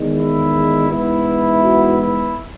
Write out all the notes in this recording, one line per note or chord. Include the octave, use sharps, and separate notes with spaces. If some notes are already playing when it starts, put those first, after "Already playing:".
Already playing: E2 D#3 G#3
E4
G#2 E3 B3 E4
F#4
E4